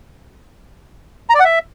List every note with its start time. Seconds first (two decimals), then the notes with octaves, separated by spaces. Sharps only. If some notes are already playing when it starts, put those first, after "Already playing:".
1.30 A#5
1.35 D5
1.40 F#5
1.45 E5